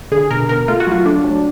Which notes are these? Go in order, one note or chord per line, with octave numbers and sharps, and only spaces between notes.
D3 G#4
B2 A#4
B2 A#4
A3 F4
F#4
F#3 F4
A3 D4
F#3